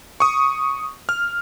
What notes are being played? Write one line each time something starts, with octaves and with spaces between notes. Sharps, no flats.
C#6 D#6
F6